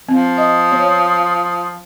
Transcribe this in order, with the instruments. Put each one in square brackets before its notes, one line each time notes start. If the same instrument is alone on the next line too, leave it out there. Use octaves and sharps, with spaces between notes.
[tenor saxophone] F3 [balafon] C4
[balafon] D#5 [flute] D#6
[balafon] B3 C#5